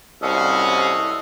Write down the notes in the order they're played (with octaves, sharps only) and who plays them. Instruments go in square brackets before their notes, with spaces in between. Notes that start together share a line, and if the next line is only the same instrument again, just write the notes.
[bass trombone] C2 [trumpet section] C#4 F#4 F5 [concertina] A4 D#5